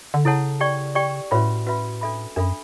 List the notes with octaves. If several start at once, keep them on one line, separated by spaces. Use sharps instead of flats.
D3
C#3 E4 A4 C#5 F#5 A5
G4 D5 G5 C#6
G4 D5 G5 C#6
A2 C#4 F#4 B4 E5 B5
C#4 F#4 B4 E5 B5
D4 A4 E5 B5
F#2 D4 A4 E5 B5